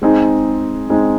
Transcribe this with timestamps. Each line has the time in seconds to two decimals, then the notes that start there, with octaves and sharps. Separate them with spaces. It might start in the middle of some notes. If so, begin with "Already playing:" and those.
0.02 G#3 C4 D#4 G#4
0.90 G#3 C4 D#4 G#4